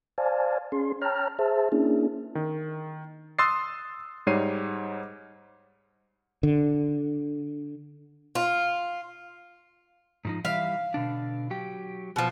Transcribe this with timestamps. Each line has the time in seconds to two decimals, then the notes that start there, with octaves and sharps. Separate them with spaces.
0.18 C5 D5 F5 G#5 A5
0.72 C#4 G#4 C6
1.02 C#5 G5 A5 A#5 F6
1.39 G#4 C5 E5 A5
1.72 A#3 C#4 D4 E4 G#4
2.35 D#3
3.39 C6 D#6 E6 F#6 A6 C7
4.27 G#2 G3 D#4 C#5 C7 D#7
6.43 D3
8.35 F4
10.25 G#2 F3 D#4
10.45 E3 G3 E5 F5
10.94 B2 D3 D4
11.50 F#3 G4 G5
12.16 B2 F3